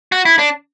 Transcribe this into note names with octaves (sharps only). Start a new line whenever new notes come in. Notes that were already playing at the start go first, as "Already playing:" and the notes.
F#4
E4
D4